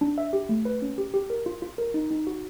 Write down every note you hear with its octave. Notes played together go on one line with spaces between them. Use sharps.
D4
E5
G4
A3
B4
C#4
G4
G4
A#4
F4
F4
A#4
D#4
D#4
F#4